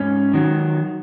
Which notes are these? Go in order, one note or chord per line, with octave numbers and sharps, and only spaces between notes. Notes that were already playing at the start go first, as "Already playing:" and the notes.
Already playing: G#2 C#4
D#3 F#3